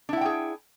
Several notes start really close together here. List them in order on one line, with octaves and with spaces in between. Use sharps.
D4 E4 F#5 G5 G#4